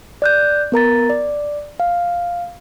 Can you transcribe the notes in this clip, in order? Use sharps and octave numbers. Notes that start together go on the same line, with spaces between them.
D5 F#6 G6
B3 A#4 A#5 A6
D5
F5